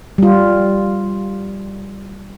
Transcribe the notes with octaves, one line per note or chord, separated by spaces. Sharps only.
G3 F4